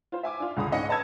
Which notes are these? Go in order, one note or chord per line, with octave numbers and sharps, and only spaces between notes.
F4 C5
E5 G#5 D6
D4 F4
C#2 D3 A#5 D#6
G#2 C#4 D#5 F#5 C#7
B4 D#5 A5 A#5 E6 G#6